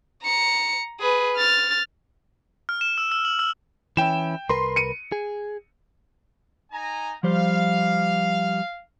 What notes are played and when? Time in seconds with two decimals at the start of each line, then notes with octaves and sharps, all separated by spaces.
0.24 A#5 C#7
1.00 G#4 B4
1.37 F6 A6
2.69 F6
2.81 E7
2.98 E6
3.12 E6
3.25 F#7
3.39 E6
3.97 E3 C#4 E4 G5 E7
4.49 C2 A#4 B4 C6
4.76 C#7 D#7
5.12 G#4
6.72 D#4 G#5 A#5
7.23 F3 G3 C5 F5